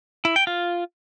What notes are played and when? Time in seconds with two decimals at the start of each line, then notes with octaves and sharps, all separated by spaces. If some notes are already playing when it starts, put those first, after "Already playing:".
0.25 E4
0.36 G5
0.47 F4